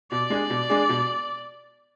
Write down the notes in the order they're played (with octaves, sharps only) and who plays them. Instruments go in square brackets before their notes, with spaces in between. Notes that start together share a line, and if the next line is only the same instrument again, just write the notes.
[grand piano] B2 [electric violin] D5
[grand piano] G#3 D4 G#4
B2
G#3 D4 G#4
B2